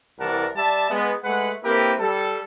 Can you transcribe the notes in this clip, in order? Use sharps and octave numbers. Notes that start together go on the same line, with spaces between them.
C2 E3 A#4 D5 F#5 A5
G3 D5 E5 A5
G#3 B3
G#3 A3 B4 F#5
A#3 C4 E4 G4 A#4 B4
G3 A4